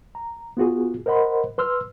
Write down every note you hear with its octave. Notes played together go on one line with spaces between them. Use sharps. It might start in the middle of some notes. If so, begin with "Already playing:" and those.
A#5
B3 F4 F#4 G#4
A#4 C5 D#5 F#5 B5 C6
B4 C6 E6 F6